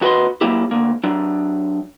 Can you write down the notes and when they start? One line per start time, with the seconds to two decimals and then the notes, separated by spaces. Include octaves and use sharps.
0.01 D#2 F#4 B4 D#5 C6
0.41 F#3 A#3 E4 G4
0.71 D2 A#3
1.04 F#3 D4